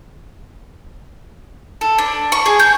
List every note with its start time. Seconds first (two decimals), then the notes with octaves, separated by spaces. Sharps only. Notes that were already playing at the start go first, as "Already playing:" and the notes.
1.81 A4
1.98 D4
2.32 C#6
2.46 G#4
2.60 G6